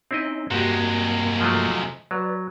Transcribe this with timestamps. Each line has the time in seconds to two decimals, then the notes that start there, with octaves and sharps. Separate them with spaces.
0.11 C4 C#4 D#4 E4 D#5
0.51 G2 C3 G#3 A#3 F#4 G4
1.41 F3 F#3 A3
2.11 F#3 B4 D5